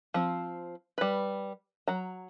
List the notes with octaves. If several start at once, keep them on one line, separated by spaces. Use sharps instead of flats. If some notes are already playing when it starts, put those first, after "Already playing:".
F3 C4
G3 B4
F#3 A#5